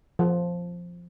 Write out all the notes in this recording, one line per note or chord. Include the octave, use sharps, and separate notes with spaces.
F3